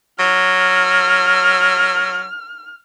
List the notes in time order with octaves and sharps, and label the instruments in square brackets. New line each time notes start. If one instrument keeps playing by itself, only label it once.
[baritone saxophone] F#3 [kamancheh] F6